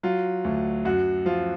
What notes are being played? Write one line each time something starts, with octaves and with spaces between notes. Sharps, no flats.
F#3 F4
D2
F#2 F#4
F3 F4